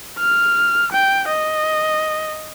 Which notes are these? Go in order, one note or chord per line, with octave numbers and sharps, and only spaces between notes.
F6
G5
D#5